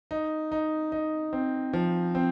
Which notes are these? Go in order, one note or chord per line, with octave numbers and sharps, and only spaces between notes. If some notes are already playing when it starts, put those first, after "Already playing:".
D#4
D#4
D#4
C4
F3
C4